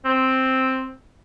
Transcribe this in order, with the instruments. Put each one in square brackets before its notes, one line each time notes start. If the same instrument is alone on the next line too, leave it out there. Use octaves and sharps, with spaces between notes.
[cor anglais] C4